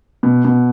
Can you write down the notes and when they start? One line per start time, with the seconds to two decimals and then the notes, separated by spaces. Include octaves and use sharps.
0.23 B2
0.45 B2